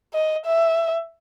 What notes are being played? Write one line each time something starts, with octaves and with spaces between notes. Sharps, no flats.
D#5
E5